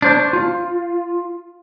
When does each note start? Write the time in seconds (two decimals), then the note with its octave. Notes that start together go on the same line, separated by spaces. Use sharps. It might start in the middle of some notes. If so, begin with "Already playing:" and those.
0.02 D4 C5 C#5
0.33 F4